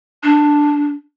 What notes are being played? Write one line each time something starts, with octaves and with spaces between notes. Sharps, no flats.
D4